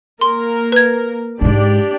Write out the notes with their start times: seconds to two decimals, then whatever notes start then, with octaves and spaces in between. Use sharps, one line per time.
0.21 A#3 A#4 C6
0.72 B4 G#6
1.41 G#2 G#3 D4 G4 D5